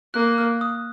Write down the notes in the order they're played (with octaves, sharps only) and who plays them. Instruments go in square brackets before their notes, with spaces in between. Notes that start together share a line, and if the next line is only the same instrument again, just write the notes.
[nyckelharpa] A#3 [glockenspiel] F#6
[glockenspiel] F6
D#6